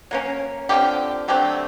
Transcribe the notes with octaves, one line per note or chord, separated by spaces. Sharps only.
F#3 A#3 C#4
D3 F3 A3 C4 G4
D3 F#3 A3 C4 G4